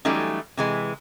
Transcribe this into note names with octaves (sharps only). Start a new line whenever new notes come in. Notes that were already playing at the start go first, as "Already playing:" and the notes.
E3 F#3 G3 A3 C#4 D#4
C3 E3 G#3